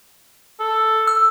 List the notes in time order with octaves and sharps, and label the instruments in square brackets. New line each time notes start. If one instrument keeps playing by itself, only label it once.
[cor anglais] A4
[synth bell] E6